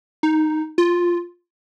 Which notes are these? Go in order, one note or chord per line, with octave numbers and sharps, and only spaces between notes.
D#4
F4